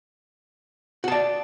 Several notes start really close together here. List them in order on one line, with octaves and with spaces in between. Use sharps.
F#4 A5 D5